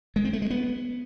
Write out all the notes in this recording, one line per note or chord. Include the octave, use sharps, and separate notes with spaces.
G#3
C4
A3
G#3
B3